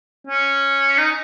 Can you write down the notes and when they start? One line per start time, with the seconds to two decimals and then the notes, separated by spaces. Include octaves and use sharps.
0.27 C#4
0.98 D#4